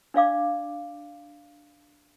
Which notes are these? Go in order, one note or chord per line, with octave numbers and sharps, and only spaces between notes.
D4 D5 F5 D6